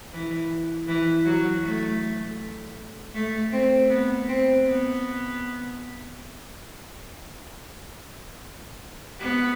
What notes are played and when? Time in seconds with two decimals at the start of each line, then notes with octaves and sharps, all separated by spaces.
0.12 E3
0.88 E3
1.25 F#3
1.63 A3
3.15 A3
3.52 C4
3.90 B3
4.28 C4
4.65 B3
9.19 B3